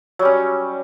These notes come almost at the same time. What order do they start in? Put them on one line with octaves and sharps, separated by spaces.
F#3 G3 C#4